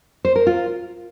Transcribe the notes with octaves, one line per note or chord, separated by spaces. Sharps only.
C5
A#4
F4